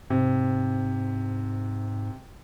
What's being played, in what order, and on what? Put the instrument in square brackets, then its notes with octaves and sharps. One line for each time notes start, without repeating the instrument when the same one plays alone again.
[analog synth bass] G#2 [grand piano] C3